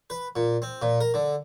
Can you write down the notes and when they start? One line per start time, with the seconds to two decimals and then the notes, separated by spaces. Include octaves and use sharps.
0.10 B4
0.36 A#2
0.62 C4
0.82 A#2
1.01 A#4
1.14 D3